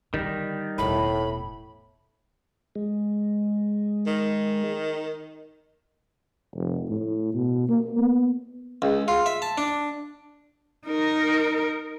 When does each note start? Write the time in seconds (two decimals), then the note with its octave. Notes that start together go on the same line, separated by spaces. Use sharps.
0.14 D3 D#3 G3
0.78 E1 A1 A2 B5
2.75 G#3
4.07 D#3
6.56 F1
6.90 A2
7.34 B2
7.69 A#3
7.99 B3
8.82 C#2
9.08 F4
9.26 E5
9.42 A5
9.58 D4
10.87 D#4 A#4